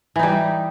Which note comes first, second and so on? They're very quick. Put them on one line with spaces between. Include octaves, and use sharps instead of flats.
E3 D#4 G3